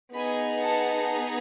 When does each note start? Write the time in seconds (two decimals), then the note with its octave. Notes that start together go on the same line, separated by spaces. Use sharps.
0.14 B3 D#4 G#4 G#5 B5
0.60 F#5 A5